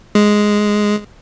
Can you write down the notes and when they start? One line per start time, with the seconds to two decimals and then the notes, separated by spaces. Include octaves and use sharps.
0.15 G#3